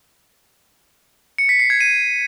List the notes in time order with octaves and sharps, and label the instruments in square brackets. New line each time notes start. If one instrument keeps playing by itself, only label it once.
[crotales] C#7
B6
C7
G#6
D#7